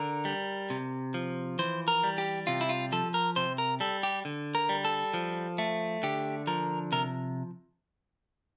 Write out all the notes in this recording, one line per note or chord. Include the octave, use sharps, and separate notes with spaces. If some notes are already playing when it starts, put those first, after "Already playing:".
Already playing: D3 A#4
G3
C3
F3
E3 C5
A#4
G3
G4
C3 F4
E4
F4
F3 A4
A#4
C3 C5
A#4
G3 A4
G4
D3
A#4
G3
A4
F3
A3
D3 G4
F3 A#4
C3 A#4